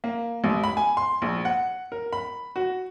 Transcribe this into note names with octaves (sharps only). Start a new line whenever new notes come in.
A#3
A1
B5
G#5
C6
A#1
F#5
A#4
B5
F#4